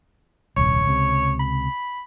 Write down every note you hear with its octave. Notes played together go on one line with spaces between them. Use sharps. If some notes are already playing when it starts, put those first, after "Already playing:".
D#1 C2 C#5
C#2 C3
B5